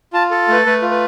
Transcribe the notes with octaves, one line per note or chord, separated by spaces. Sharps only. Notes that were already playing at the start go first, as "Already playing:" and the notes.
F4 A5
A4
A3 B4
A3 B4
F4
B4